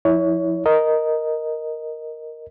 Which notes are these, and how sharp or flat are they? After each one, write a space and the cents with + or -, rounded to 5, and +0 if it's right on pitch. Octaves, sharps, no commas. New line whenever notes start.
F3 +0 E4 -20 C#5 +20
A#4 +0 D#5 +0